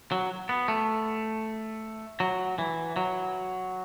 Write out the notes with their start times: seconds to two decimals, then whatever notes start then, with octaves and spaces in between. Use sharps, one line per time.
0.12 F#3
0.49 B3
0.68 A3
2.20 F#3
2.58 E3
2.96 F#3